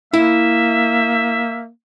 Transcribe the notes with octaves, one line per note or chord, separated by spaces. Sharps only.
A#3 E4 E5